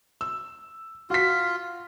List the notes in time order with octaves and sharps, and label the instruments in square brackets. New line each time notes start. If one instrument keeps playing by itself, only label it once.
[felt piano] E6
[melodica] F4 [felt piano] F#4 B6